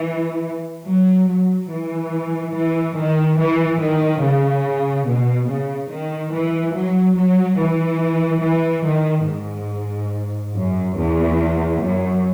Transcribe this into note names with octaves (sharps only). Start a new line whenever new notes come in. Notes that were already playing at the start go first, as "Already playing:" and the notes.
Already playing: E3
F#3
F#3
E3
E3
D#3
E3
D#3
C#3
B2
C#3
D#3
E3
F#3
F#3
E3
E3
D#3
G#2
F#2
E2
F#2